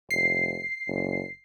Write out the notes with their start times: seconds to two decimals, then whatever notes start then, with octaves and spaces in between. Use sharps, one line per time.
0.11 F1 C7
0.88 F#1